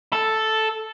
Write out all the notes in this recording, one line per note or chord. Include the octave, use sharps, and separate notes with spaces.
A4